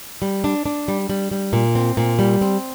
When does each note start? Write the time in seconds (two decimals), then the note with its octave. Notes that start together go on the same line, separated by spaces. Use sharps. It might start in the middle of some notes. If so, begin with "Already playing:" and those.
0.22 G3
0.44 D4
0.66 D4
0.88 G3
1.09 G3
1.31 G3
1.53 A#2
1.75 C4
1.97 A#2
2.19 G3
2.41 C4